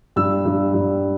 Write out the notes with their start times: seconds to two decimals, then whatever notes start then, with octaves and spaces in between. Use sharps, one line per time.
0.16 G2 E6
0.45 G2
0.73 G2